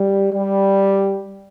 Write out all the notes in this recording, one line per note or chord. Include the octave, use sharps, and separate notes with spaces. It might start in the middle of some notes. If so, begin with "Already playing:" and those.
Already playing: G3
G3